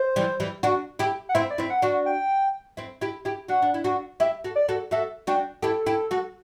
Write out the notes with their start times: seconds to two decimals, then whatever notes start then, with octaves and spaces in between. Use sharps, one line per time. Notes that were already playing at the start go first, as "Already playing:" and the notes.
Already playing: C5
0.16 E3 G3
0.40 E3 G3
0.63 D4 F#4
0.99 E4 G4
1.29 F#5
1.35 C4 E4 E5
1.50 D5
1.58 C4 E4 E5
1.70 F#5
1.82 D4 F#4
2.06 G5
2.77 C4 E4
3.01 E4 G4
3.25 E4 G4
3.48 D4 F#4 F#5
3.62 D4
3.74 E4
3.84 D4 F#4
4.20 E4 G4 E5
4.44 F#4 A4
4.56 D5
4.68 F#4 A4
4.91 F#4 A4 E5
5.27 D4 F#4 G5
5.62 E4 G4 A4
5.86 E4 G4
6.11 F#4 A4